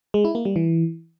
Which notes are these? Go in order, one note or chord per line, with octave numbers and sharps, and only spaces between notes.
G#3
E4
A#3
G3
E3